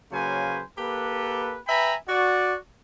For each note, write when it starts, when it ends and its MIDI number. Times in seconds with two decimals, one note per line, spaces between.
0.12 0.62 49
0.12 0.62 54
0.12 0.62 58
0.12 0.62 71
0.12 0.62 72
0.12 0.62 80
0.78 1.57 58
0.78 1.57 67
0.78 1.57 69
0.78 1.57 71
1.68 1.94 71
1.68 1.94 76
1.68 1.94 79
1.68 1.94 80
1.68 1.94 82
1.68 1.94 83
2.08 2.55 66
2.08 2.55 74